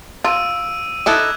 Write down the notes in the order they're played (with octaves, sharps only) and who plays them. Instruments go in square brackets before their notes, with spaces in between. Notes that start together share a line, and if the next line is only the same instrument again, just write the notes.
[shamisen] F4 [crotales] E6 D7 D#7
[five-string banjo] D#4 E4 A4 [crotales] D6 F#6 G#6